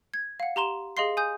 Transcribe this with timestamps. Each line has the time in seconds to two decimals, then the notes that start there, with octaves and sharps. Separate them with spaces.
0.14 G#6
0.40 F5 F#5
0.56 G4 A#5 C6 E7
0.97 G#4 D#5 F5 C6 C7
1.17 G#5 D#6 G6